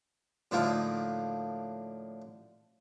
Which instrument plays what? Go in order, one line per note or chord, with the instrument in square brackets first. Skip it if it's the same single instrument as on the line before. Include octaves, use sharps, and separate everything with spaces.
[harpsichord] A2 D3 F3 A#3 D#4